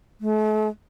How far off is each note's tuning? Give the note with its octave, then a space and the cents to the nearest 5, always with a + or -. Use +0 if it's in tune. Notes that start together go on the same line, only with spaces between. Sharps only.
A3 -40